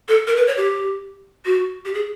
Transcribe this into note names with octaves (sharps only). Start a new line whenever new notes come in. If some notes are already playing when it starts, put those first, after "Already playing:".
A4
A#4
B4
C#5
G4
F#4
G4
G#4